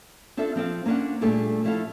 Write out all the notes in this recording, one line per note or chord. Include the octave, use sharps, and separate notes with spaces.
C4 D4 F4 A4 E5
F3 C4 A4 F5
A#3 C#4 D4 C5 F#5
A#2 G3 A3 D4 G#4 A4
F3 A3 E4 A4 E5 F5